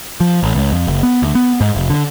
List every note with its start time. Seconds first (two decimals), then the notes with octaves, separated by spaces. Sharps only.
0.20 F3
0.43 A1
0.55 C#2
0.72 F2
0.87 F#1
1.03 B3
1.22 D2
1.35 B3
1.61 G#2
1.75 F1
1.90 D3